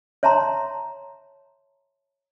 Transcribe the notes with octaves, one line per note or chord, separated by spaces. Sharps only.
C#5 E5 A5 A#5 C6